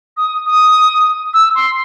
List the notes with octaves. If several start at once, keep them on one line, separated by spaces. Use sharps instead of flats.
D#6
D#6
E6
C6